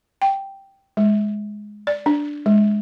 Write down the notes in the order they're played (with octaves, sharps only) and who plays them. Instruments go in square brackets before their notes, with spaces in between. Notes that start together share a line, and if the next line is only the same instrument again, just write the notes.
[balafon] G5
G#3
D5
D4
G#3